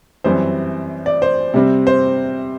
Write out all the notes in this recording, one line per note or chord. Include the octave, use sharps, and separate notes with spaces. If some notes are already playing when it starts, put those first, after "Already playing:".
F#2 E3 G3 C4 C5
D5
C5
C3 G3 C4
C5